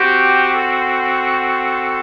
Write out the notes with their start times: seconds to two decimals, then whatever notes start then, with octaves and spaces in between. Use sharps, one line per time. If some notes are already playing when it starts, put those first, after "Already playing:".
Already playing: C4 F#4 G4
0.53 A4